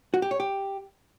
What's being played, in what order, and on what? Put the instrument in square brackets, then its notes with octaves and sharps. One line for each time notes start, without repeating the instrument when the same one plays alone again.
[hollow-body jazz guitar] F#4
G4
C#5
G4